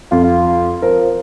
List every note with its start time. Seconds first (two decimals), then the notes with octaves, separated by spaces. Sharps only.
0.12 F2 F4
0.24 F4
0.82 F3 A#4